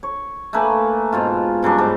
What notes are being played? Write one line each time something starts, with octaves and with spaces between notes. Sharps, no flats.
C#5
A3 A#3 B4 G#5
G#2 B2 F4
G2 C#3 F#3 D4
G#2 C#3 B3 D6